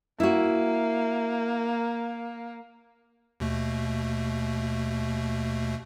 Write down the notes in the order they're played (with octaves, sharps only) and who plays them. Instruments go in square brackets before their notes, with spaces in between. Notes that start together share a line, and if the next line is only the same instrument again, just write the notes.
[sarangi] A#3 [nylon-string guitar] E4 F#4
[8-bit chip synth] D#2 B2 A3